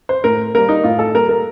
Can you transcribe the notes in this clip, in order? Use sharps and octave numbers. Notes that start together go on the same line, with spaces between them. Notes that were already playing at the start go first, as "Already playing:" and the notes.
C5
A2 A#4
G3 A#3 A#4
D#4
A2 F4
A4
G3 A#3 A#4
A#4